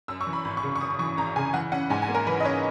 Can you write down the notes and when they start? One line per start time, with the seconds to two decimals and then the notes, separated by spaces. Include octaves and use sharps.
0.08 F#2 E6
0.21 C#6
0.27 E3
0.33 B5
0.45 G#1 B5
0.57 C#6
0.63 C#3
0.76 C#6
0.81 F#2 D#6
0.99 E3 C#6
1.17 G#1 A#5
1.36 C#3 G#5
1.54 E3 F#5
1.72 C#4 F#5
1.90 G#2 G#5
2.02 G#5
2.08 A#3
2.15 A#4
2.27 E3 B4
2.40 D#5
2.44 C#4 C#5